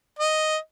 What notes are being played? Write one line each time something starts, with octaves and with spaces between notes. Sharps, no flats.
D#5